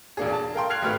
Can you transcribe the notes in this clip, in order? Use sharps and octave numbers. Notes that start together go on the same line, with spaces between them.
E1 A#2 A#3 D4 G#4
A5
A#4 F5 G5 C6
F6 F#6 G#6 C7 F7
G#1 A3 F#4 G4 B4 F6